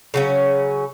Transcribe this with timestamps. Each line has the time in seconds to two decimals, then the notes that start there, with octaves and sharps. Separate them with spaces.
0.14 C#3 F#3 C#4